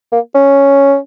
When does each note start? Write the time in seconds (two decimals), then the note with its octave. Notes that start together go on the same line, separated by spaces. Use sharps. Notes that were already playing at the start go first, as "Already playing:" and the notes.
0.12 A#3
0.35 C#4